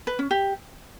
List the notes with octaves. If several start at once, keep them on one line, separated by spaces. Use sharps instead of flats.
B4
C#4
G4